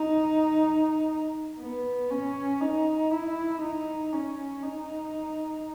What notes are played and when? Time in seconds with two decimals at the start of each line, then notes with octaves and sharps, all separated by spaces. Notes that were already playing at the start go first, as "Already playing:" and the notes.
Already playing: D#4
1.60 B3
2.10 C#4
2.60 D#4
3.11 E4
3.61 D#4
4.13 C#4
4.62 D#4